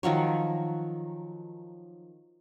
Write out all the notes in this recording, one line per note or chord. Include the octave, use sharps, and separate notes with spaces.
D#3 F3 F#3 C#5